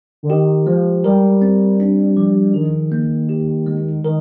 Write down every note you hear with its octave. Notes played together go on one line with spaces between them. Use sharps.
D3
D#3 G4
F3 G#3
G3 A#4
C4
D4
F3
D#3 G#4
A#3
G4
G#3
D#3 A#4